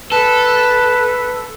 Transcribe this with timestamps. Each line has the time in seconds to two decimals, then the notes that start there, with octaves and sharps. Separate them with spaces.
0.12 A4 B4